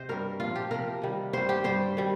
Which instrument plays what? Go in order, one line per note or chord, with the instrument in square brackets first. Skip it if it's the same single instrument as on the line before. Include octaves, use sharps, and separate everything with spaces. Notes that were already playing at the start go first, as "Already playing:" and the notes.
Already playing: [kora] C3 C5 D#5
G2 G3 A#4
A#2 F3 F4
G4
C3 F3 A#4
C3 D#3 G3
G2 G3 C5
G4
G2 G3 C5
D#3 G3